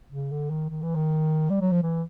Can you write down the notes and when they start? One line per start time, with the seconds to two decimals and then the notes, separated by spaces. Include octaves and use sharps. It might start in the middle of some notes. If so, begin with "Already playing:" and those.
0.12 C#3
0.31 D3
0.50 D#3
0.70 D#3
0.82 E3
0.95 D#3
1.50 G3
1.61 F#3
1.72 F3
1.83 E3